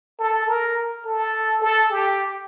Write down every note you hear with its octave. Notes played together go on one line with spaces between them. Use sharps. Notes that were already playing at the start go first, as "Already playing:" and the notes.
A4
A#4
A4
A4
G4